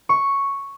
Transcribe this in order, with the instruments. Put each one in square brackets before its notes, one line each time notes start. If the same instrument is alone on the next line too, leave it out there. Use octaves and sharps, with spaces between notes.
[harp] C#6